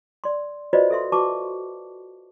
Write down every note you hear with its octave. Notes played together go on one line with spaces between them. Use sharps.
D5 C6
F4 F#4 B4 C5 D5 D#5
A4 E5 C6
F#4 B4 A5 C#6 D6